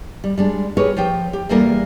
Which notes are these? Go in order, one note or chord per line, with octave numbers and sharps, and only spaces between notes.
G3
G3 G#3 D4
G4 G#4 A#4 B4 C#5
F3 G4 C5 G5
G4
E2 E3 G3 A#3 A4 A#4